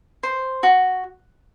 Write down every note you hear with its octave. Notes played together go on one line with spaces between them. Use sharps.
C5
F#4